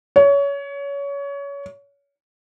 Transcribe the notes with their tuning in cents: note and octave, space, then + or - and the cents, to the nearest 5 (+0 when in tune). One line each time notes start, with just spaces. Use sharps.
C#5 +25